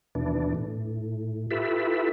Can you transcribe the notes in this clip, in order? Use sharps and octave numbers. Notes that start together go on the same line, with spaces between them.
D#2 B2 E3 D4
A2
E4 F4 G4 A4 B4 E5